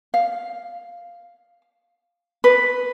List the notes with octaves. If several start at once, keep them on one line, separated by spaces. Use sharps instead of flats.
F5
B4